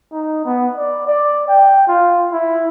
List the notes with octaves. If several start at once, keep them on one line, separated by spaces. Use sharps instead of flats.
D#4
B3
D5
D5
G5
F4
E4